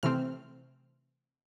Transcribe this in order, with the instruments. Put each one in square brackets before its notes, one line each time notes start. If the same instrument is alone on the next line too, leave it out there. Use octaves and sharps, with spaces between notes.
[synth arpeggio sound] C3 E3 A3 C4 F6